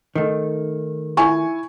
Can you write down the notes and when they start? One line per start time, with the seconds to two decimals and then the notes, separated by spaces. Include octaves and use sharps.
0.16 D#3 A3
1.17 E4 G#5 C#6